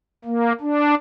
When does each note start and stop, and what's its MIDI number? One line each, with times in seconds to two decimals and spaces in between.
0.25 0.53 58
0.60 0.95 62